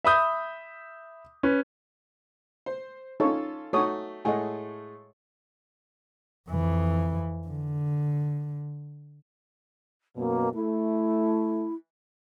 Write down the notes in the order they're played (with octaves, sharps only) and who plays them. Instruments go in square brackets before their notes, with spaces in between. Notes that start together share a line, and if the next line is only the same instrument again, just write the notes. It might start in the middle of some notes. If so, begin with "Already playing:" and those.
[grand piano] E5 B5 D#6 G6
C#4 B4
[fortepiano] C5
[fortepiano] C#4 F4 A4 [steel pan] D#4 C#5
[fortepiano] A3 D#4 [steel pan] F#4 C#5 D#6
[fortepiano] A2 G#3 A3 [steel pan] D#5 F#5 G#5
[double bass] F2 E3
D3
[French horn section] F#2 B2 [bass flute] A#3
[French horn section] A3 [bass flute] E4